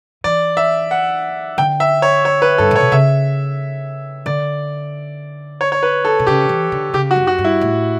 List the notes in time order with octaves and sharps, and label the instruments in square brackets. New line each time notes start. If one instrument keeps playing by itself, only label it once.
[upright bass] E3 [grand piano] D5
[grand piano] E5
F#5
[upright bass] D3 [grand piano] G5
[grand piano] E5
C#5
C#5
B4
[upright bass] G2 [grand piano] A4
[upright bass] A2
[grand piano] C#5
[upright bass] B2
[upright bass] C#3 [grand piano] E5
[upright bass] D3 [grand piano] D5
[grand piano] C#5
C#5
B4
A4
[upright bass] B2
[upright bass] C#3 [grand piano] G4
[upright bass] E3
D3
[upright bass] C#3 [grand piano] G4
[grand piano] F#4
[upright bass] F#2
[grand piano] F#4
[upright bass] G2
[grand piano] E4
[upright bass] A2